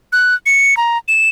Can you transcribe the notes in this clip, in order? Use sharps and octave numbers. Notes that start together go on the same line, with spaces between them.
F#6
C#7
A#5
E7